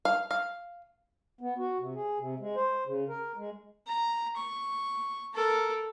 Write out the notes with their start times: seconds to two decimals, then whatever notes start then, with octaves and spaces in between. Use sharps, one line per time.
0.05 F5
0.31 F5
1.41 B3
1.58 F#4
1.79 C3
1.95 G#4
2.18 C3
2.40 G#3
2.56 C5
2.87 C#3
3.09 A#4
3.37 G#3
3.87 A#5
4.36 C#6
5.34 A4 A#4